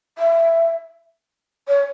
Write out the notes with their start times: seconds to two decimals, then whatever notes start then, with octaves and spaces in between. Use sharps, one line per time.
0.18 E5
1.68 C#5